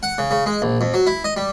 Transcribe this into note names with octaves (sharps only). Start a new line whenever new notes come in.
F#5
C#3
C#3
G#3
A#1
F2
F#3
E4
D#5
G3